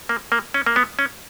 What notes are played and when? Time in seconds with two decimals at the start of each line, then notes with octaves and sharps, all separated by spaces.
0.09 A#3
0.32 A#3
0.54 C#4
0.66 A#3
0.76 B3
0.99 C#4